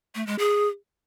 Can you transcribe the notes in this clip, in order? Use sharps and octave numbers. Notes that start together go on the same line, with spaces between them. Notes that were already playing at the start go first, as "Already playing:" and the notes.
A3
G#3
G#4